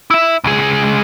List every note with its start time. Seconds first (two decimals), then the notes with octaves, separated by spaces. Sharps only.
0.10 E4 E5
0.44 C#2 G#4